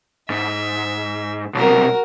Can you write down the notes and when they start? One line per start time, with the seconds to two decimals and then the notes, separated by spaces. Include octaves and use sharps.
0.30 G#2 E5
1.55 B1 C3 F#4 A#4